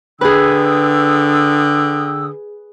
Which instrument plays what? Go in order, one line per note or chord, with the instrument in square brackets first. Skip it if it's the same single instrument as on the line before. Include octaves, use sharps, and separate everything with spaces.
[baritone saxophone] D3 [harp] G#4 B4 [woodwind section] G5 D#6 E6